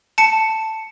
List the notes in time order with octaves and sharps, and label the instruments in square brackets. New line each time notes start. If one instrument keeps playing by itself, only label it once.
[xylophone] A5 C#7